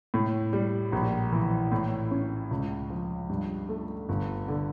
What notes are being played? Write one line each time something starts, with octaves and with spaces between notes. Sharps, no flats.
A2
G3
A#1
E3
A2
C#4
C#2
F3
G2
A3
G1
D3